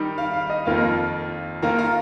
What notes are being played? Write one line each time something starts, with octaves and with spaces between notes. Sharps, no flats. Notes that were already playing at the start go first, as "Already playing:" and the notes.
Already playing: D#3 G3 D#4
F5
F5
D#5
F2 D#3 A#3 F4 F5
D#3 A#3 F4 F5 A#5
F5 A#5